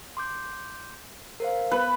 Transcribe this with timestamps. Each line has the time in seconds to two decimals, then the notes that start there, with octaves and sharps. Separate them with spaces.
0.17 C6 D6 G6
1.40 A#4 C5 F5
1.71 B3 B4